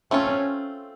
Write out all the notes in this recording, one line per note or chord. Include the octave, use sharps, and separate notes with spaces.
A3 C4 C#4 F4